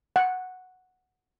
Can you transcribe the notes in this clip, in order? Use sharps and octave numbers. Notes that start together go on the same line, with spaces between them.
F#5